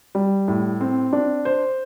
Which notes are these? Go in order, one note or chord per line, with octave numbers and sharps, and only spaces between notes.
G3
A2
C4
D4
C5